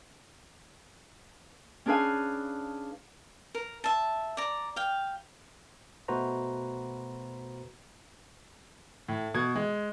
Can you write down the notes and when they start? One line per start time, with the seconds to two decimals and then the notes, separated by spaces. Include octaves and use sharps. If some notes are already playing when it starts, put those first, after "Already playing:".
1.86 C#4 D4 G#4 B4 F5 G#5
3.55 A#4
3.84 E5 A5
4.37 D5 A#5
4.76 F5 G5
6.08 B2 A3 F#4 B4 C5 A#5
9.08 A2
9.34 B2 G#6
9.56 G#3